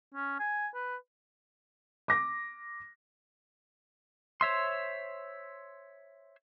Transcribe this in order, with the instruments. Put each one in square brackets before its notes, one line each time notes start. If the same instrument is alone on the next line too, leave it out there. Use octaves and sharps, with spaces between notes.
[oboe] C#4
G#5
B4
[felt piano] D6 A#6
[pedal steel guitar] C5 C#5 E5 C6